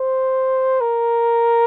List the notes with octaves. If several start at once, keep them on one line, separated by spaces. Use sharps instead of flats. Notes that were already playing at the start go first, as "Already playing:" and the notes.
Already playing: C5
A#4